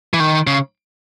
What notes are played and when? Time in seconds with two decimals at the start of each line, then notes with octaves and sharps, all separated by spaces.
0.14 E3
0.20 D#3
0.47 C#3